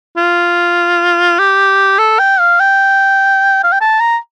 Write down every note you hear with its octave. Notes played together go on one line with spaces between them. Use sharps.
F4
G4
A4
G5
F5
G5
F5
G5
A5
A#5